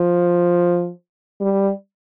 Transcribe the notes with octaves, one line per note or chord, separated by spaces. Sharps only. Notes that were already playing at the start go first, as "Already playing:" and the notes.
Already playing: F3
G3